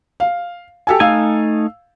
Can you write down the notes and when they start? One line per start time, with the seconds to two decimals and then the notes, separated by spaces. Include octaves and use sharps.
0.20 F5
0.87 G4 A4 G#5
1.00 A3 D#4 F5 G#5 E6